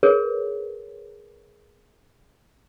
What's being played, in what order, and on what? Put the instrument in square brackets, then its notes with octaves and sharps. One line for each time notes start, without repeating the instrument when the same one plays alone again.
[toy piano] G#4 A#4 B4 C#5